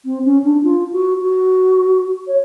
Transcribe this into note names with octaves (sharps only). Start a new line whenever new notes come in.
C4
C#4
D4
F4
F#4
F#4
C#5